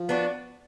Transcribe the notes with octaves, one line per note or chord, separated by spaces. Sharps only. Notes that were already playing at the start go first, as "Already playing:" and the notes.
Already playing: F3
B3 D4 F#4